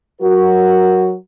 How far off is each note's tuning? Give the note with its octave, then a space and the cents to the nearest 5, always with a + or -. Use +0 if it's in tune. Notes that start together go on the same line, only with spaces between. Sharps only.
F#3 +0 F#4 +0 A#4 +0